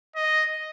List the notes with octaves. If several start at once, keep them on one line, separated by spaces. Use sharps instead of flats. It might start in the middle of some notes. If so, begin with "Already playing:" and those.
D#5